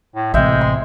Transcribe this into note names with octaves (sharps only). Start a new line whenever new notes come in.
A2
A1 C3 G#3 E5 G5
C6